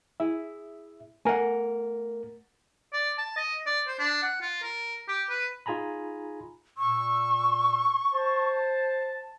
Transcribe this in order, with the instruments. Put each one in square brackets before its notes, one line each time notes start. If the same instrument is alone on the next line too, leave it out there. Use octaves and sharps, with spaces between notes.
[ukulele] E4 G#4 [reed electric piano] E5
[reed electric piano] A3 A#4 [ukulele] F#5 G#5
[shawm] D5
A5
D#5
D5
C5
D4
F#5
F4
A#4
G4
B4
[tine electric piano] D#4 F4 G#4 G#5 A#5 B5
[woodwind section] A#2 E6 [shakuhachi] C#6
[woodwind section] C5 A5